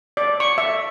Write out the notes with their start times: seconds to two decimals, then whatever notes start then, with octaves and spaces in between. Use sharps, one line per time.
0.17 D5
0.40 C#6
0.58 E5